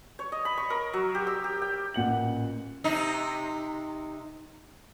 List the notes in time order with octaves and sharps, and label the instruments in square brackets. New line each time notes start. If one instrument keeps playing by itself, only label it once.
[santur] C#5
D#5
B5
C#6
A#4
F#3
G4
E6
G4
G5
[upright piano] A1 A#2 F#5 F#7
[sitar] C3 D#4